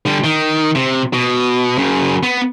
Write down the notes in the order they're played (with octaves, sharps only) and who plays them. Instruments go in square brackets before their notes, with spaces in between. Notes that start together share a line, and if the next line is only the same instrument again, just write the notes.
[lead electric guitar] D3 G3
D#3
C3
B2
F#2 C#3
B3